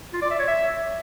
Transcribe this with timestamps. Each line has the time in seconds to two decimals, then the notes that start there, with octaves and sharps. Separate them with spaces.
0.13 F4
0.22 D5
0.31 E5
0.39 C#5
0.48 E5